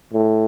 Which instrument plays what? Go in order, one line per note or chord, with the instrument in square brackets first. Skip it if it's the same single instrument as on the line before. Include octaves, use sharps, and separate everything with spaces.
[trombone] A2